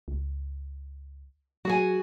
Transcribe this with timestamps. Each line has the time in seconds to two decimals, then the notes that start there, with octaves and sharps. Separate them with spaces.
0.08 C#2
1.65 F#3 F#4 G#4 G#5